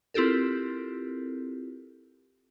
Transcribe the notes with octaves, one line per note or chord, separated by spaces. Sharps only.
C4 E4 F4 G4 A4 A#4